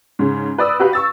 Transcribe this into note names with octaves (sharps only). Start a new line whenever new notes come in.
G#2 C#3
B4 D5 D#6 E6
F#4 G4 B4 F5
C#6 E6 A6